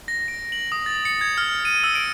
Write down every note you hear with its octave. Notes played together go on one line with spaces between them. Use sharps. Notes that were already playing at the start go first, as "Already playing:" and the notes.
A#6
D7
F#7
D#6
A6
C#7
G#6
F6
D#7
E6
D7